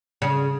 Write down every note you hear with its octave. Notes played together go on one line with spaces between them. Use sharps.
C#3